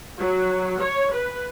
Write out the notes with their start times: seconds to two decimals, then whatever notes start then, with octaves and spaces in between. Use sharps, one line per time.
0.19 F#3
0.80 C#5
1.13 B4